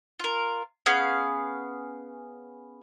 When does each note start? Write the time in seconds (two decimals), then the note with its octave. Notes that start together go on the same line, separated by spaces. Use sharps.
0.20 F4 A#4
0.86 B3 C#4 G#4 F5